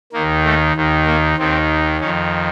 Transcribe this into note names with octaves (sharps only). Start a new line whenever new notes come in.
D#2 D#3 A#3
A3
D#2 D#3
A#3
D#2 D#3 C4
F2 D#3 C#4